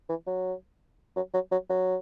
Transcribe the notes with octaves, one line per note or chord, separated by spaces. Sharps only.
E3
F#3
F#3
F#3
F#3
F#3